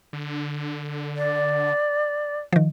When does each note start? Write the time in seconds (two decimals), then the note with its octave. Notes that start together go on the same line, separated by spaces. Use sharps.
0.13 D3
1.16 D5
2.52 D#3 F3